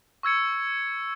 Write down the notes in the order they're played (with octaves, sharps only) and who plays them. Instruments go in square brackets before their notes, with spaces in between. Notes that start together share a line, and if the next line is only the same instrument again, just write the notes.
[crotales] C#6 E6 G#6 C#7